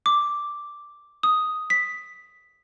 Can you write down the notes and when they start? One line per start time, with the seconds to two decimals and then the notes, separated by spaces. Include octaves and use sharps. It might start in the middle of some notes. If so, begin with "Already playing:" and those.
0.06 D6
1.23 D#6
1.70 B6